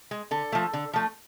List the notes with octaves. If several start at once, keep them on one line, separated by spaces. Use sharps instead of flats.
G#3
D3 A4
F3 A3
D3
F3 A3